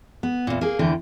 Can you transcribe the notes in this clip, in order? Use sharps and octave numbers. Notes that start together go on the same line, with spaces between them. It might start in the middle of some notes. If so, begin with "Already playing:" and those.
B3
E2 A#2
A#3 G#4
E2 D3 E3 G5